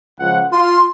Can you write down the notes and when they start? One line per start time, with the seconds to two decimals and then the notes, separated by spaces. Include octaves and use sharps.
0.19 C#2 F3 F#5
0.52 F4 C6